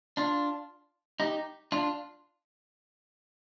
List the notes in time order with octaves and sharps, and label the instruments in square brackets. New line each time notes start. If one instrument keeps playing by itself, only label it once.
[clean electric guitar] D4 F4
D#4 G4
D4 F4